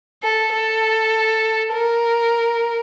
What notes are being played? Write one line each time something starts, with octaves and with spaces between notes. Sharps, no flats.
A4
A4
A#4